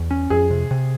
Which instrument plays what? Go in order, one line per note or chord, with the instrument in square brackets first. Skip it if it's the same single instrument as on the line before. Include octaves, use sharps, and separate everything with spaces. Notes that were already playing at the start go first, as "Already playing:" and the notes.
Already playing: [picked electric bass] E2
C#4
[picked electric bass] F2 [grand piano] G#4
[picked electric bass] C3
C3